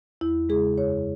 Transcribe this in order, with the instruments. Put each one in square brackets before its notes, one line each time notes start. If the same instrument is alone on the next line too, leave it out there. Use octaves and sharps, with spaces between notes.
[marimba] E2 E4
C#3 G#3 G#4
F#2 C#5